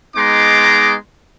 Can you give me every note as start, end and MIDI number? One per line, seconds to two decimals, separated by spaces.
0.16 0.95 56
0.16 0.95 59
0.16 0.95 63
0.16 0.95 82
0.16 0.95 84
0.16 0.95 86